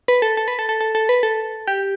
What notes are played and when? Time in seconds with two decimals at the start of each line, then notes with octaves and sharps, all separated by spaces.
0.08 B4
0.22 A4
0.37 A4
0.48 B4
0.59 A4
0.69 A4
0.81 A4
0.95 A4
1.09 B4
1.23 A4
1.67 G4